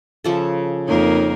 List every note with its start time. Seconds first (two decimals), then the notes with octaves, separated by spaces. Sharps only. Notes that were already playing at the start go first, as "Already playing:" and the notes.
0.24 C#3 F3 A4
0.87 F2 A#3 D#4 A#4 C#5